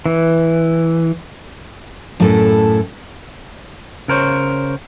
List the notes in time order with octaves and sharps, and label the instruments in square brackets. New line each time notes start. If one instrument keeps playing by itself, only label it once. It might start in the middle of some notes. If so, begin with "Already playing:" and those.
[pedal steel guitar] E3
[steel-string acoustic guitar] F#2 A2 E4 A4
[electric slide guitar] C#3 A#4 C5 C#5